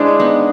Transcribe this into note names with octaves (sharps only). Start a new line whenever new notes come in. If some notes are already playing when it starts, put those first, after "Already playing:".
Already playing: G#3 D4 E4 G#4 C5
B3 D#4